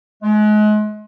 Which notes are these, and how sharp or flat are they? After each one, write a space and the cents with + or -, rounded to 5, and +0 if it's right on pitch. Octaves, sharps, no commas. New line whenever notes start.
G#3 +35